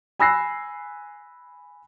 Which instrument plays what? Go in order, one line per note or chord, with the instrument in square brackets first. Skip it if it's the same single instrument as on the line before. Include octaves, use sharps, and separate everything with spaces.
[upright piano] G#5 B5 E6 F#6 A#6 C7